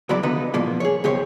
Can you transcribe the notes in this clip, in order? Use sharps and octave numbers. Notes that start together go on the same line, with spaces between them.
C#2 E3 F#3 F#4 D5 B5
D#2 D3 B3 D#4 B4
A#2 E3 F3 A#3 B3
G#4 C#5
B1 C#3 G4 C5 C#5